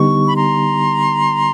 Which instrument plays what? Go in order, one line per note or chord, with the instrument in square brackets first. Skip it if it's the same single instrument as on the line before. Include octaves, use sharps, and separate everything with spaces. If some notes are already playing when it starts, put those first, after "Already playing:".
Already playing: [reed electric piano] D3 G3 B3 D#4 G4 [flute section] C#6
[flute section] B5
A#5 C6